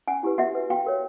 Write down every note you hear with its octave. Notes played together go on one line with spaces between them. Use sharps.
C#4 F#5 G#5
E4 G4 B4
F#4 E5 F#5
B4
F#4 F5 G5
A#4 C#5